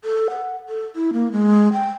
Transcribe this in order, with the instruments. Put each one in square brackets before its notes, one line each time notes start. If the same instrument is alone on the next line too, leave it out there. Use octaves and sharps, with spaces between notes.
[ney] A4
F#5
A4
E4
A#3
G#3
G5